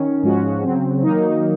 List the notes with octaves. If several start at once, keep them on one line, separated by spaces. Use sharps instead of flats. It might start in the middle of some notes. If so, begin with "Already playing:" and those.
Already playing: D#3 C#4
G#2 F3 G#3 C#4 F#4
C#3 F#3 C4
D#3 F#3 A#3 D#4